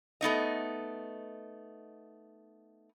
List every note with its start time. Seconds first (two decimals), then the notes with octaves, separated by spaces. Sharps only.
0.21 A3 B3 D#4 D#5